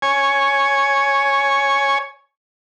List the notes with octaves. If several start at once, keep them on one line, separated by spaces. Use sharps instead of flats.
C#5 G#5